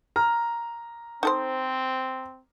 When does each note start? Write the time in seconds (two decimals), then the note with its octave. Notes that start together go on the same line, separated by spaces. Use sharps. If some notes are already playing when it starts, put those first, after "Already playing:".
0.16 A#5 F6
1.23 C4 D#4 A4 C5